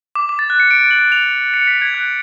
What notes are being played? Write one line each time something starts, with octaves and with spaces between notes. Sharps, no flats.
D6
D6
A6
F#6
C#7
D7
F#7
F7
C#7
B6
G#6
F#6